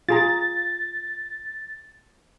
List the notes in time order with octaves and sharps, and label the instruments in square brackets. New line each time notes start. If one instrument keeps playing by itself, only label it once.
[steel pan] F4 G#4 A#5 [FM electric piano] A6